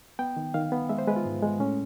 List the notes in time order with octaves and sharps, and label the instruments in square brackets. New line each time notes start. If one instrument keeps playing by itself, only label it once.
[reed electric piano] B3 G5
D#3
D#3 F5
B3
G#3 E5
C5
G#3 B4
F4
G#2
G#3
A2 C#4